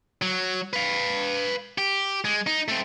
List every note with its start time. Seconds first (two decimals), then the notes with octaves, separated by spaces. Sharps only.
0.22 F#3
0.73 B4 F5
1.78 G4
2.25 G#3
2.47 D#4
2.68 A3 C4